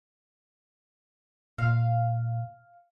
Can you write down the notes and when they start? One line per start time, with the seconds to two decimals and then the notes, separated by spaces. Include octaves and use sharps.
1.58 A#2 F5